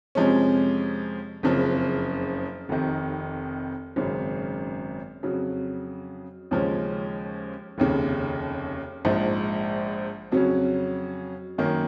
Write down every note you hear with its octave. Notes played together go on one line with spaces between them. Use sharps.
F2 C3 F3 G#3 C#4
F#1 F2 C#3 F3
F1 F2 C3 D#3
G#1 F#2 C#3
F2 C#3 F#3
D#2 C#3 F3 G#3 C#4
F1 D#2 C#3
A#1 G#2 F3
F2 C#3 F#3 C#4
F#2 D#3 A#3 C#4